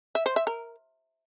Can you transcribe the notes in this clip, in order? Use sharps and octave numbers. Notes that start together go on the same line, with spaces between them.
E5
C5
E5
A#4